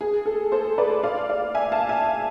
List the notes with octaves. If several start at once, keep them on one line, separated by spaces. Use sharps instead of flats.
G#4
A4
A4 C5
B4 D5
D5 F5
D5 F5
E5 G#5
F5 A5
E5 G#5